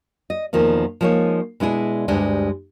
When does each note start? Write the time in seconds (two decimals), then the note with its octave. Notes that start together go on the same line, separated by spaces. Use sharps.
0.30 D#5
0.53 E2 B2 D#3 F3 A#3
1.01 F3 G#3 A#3 D#4 C#5
1.60 B2 G#3 D4 E4 G#4
2.08 D2 G2 G3 G#3 D4